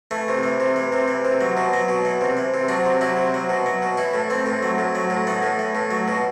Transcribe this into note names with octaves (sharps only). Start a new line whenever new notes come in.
E3 A3
C3
E3
C3
E3
C3
E3
C3
F#3
B2
F#3
B2
E3
C3
E3
C3
F#3 D4
C3
F#3 E4
C3
F#3
B2
F#3
B2
E3 E4
A2
E3 C4
A2
F#3
A2
F#3
A2
E3 B3
A2
E3
A2
F#3
B2